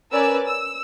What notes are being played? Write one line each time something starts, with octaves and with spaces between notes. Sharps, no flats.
C#4 A#4 B4 D5 G#5 E6
E6